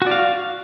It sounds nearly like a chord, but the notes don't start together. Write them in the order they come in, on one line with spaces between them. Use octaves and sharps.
F#4 D5 F5